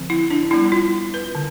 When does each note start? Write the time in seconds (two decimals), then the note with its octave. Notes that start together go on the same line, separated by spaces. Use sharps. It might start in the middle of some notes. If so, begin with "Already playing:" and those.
Already playing: D3 F3 C4
0.10 E4
0.30 D4
0.51 G3 B3 D4 E4
0.72 F4
1.14 B4
1.35 D3